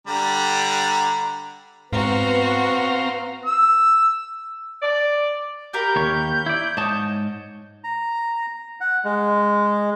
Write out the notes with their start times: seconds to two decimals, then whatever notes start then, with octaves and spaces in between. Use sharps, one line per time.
0.07 D3 G3 A#5
1.93 G#2 B3 C4 F#4 F5 A#5
3.46 E6
4.81 D5
5.73 G4 A#4 B5 G6
5.96 D#2 C#5
6.46 E4 D5
6.77 G#2 C#5 D#5 A5
7.84 A#5
8.80 F#5
9.04 G#3